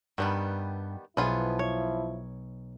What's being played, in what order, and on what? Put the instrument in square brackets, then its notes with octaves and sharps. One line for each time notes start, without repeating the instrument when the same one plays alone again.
[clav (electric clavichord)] G2 [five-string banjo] D#3 G3 B3
[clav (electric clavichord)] B1 [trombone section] F3 E4 [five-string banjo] B3 F4 G#4
[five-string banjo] C#5